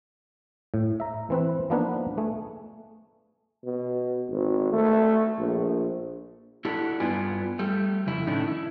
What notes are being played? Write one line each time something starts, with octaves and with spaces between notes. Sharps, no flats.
A2
E5 A#5
E3 C4 B4
F3 A#3 B3 D4 D#4 B4
A3 G#4
B2
G#1
A3
A#1
D4 E4 F#4 G4 A4
G2 B3 F4 B4 D5 G#5
G3 A3
F2 C#3 E4
A2 D#3 A3 C#4 D4 E4
E4